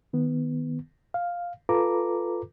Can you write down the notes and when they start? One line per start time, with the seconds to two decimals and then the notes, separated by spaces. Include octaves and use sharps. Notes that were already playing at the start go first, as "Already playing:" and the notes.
0.13 D#3 B3
1.14 F5
1.69 F4 A4 B4 A#5 D6